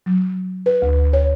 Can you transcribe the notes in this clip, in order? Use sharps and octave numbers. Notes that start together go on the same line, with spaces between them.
F#3
B4
D2
C#5